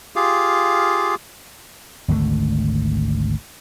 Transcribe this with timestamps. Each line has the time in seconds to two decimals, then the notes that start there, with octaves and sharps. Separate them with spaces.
0.16 F4 G4 G#4 F5
2.08 G#1 D2 D3 A3